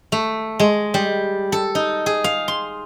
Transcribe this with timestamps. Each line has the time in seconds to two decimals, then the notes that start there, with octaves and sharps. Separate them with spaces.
0.12 A3
0.60 G#3
0.94 G3
1.52 A4
1.75 D#4
2.06 G#4
2.24 F5
2.48 C6